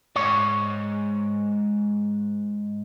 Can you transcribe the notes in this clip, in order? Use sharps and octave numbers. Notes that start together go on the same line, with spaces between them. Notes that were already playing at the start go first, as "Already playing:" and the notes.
G#2 C#5